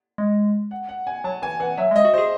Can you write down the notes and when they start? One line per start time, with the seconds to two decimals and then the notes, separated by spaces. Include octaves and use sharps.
0.18 G#3
0.71 F#5
0.89 F#5
1.07 G#5
1.24 F#3 A5
1.42 E3 G#5
1.60 E3 F#5
1.77 F#3 E5
1.91 G#3
1.96 D#5
2.05 F#4
2.14 G#4 C5